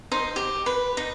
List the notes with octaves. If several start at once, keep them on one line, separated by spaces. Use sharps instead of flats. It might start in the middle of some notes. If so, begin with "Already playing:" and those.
D#4 C5
G4
B4
D#4